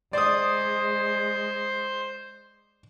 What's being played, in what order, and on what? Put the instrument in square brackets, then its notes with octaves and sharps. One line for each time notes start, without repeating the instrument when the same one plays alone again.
[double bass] G#3 [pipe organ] C5 [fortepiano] D5 D#6